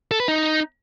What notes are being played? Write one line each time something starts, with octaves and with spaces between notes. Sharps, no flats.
A4
B4
D#4